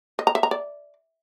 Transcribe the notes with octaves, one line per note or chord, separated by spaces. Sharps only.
D#5
A#5
E5
A#5
D5